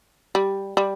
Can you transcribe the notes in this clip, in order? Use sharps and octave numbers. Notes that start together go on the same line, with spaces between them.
G3
G3